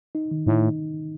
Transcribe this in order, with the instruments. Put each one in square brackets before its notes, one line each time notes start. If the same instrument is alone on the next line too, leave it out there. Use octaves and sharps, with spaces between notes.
[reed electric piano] D#4
D#3
[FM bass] A2 [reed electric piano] D#4